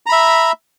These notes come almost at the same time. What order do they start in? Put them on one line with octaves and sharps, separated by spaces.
A#5 B5 E5